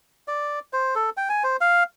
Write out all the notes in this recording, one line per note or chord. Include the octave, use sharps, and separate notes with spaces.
D5
C5
A4
G5
G#5
C5
F5